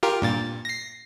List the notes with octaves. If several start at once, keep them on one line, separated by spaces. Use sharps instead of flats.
F4 G4 A#4
G2 A#2 A6
A#6 C7